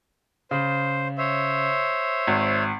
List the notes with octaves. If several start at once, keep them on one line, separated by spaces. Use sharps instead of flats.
C#3 C5
C5 C#5 E5
G#1